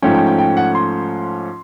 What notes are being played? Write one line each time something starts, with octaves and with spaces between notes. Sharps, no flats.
G#2 F3 A3 C#4 G5
G5
G5
G5
F#5
C6